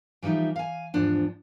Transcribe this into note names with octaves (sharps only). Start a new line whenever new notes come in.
E3 F3 G3 D#4 E5
F5 G#5
E2 G#2 F3 D4